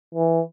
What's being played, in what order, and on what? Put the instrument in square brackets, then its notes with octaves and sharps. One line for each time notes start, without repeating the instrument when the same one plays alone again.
[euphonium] E3